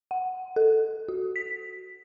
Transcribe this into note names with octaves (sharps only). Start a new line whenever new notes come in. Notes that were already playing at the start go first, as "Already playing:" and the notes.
F#5
A4
F#4
B6